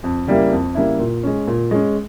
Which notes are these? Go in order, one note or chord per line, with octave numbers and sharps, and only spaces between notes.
F2
C#3 G3 A#3 E4
F2
C#3 G3 A#3 E4
A#2
G#3 C#4
A#2
G#3 C#4